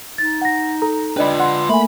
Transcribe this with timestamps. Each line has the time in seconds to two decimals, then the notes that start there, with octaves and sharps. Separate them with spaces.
0.18 D#4 A6
0.41 F#5 A#6
0.82 A4 A#5
1.17 D4 F4 B4 D5 D#5 G5 B5
1.40 F#5 C6
1.69 A3 A#3 E5 G#5 B5